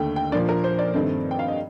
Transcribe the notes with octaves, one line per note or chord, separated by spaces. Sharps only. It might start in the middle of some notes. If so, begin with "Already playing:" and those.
Already playing: D#2 D3 A3 G5
G5
A#2 F3 A#3 D4 D5
A#4
C5
D5
G2 D#3 A3 C4
G5
F5
D#5